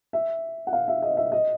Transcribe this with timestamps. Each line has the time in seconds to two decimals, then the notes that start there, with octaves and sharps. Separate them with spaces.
0.13 E5
0.67 F#5
0.73 F5
0.88 E5
1.02 D#5
1.17 E5
1.32 D#5